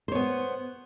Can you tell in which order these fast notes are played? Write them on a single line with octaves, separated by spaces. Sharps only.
C5 C#5 B3